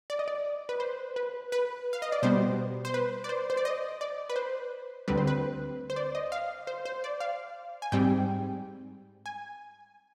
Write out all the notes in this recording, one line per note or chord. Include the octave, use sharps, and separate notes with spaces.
D5
D#5
D5
B4
C5
B4
B4
F5
D#5
D5
B2 G3 B3 C5
C5
B4
D5
C5
C5
D5
D#5
D5
B4
C5
D2 D3 G3 C4 B4
C5
B4
C5
D5
D#5
F5
C5
C5
D5
F5
G#5
G#2 G3 C4 G5
G#5